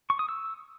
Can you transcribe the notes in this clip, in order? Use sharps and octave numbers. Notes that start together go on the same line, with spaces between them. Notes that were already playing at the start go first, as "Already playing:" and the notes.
C#6
D#6
E6